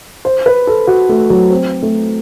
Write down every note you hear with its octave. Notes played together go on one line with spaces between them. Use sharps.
C5
B4
A4
F#4
A3
F#3
C4
A3